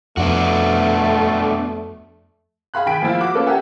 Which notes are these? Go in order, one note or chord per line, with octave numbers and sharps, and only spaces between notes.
F2 A3 B3 D4 F#4
G#4 F5 B5 F#6
D#3 G5 G#5 B6 D7
F3 A#3 E4 F4
F#4 D6
A#3 C#4 F4 A4 B4
G4 A4 A#4 E5 F#5 G#5